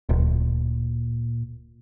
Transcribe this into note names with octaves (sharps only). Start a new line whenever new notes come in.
D1 A#2